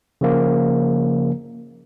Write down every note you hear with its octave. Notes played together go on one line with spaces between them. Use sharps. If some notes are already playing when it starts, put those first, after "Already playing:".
C#3 F3 A#3